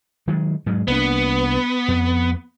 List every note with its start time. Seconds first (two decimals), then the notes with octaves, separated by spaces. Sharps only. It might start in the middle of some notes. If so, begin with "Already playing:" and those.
0.28 D#3 F#3 G#3
0.66 G#2 F#3 G#3
0.88 C2 A#3 B3 D4
1.88 F2